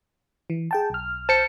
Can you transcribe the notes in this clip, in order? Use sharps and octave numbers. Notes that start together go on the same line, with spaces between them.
E3
G#4 G5 A5
B1 F6
C5 A5 C#7